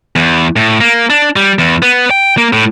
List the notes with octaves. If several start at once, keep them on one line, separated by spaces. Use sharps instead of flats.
E2
A2
A#3
D4
G3
E2
B3
G5
A#3
A2